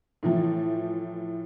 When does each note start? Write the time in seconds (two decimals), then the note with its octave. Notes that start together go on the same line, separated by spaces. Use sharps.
0.23 A2 E3 F3